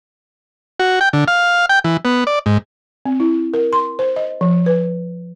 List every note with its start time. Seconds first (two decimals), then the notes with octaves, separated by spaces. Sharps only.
0.80 F#4
1.01 G5
1.13 D3
1.28 F5
1.69 G5
1.84 E3
2.05 B3
2.27 D5
2.46 G#2
3.06 C4
3.20 E4
3.54 A#4
3.73 C6
3.99 C5
4.16 D#5
4.41 F3
4.66 B4